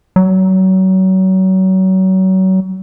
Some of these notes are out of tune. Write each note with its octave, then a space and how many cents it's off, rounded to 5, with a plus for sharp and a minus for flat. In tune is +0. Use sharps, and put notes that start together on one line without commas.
F#3 +30